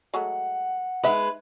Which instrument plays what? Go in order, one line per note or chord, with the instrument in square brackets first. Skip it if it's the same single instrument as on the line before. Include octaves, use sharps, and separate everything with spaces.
[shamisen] F#3 G#3 A3 [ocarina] F#5
[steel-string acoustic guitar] G#3 B4 [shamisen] D#4 E5